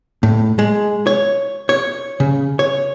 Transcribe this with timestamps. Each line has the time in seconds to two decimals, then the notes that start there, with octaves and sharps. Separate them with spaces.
0.23 A2
0.59 G#3
1.07 C#5
1.69 C#5
2.20 C#3
2.59 C#5